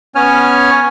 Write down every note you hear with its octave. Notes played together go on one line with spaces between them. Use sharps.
B3 C#4 C#5 G#5 F6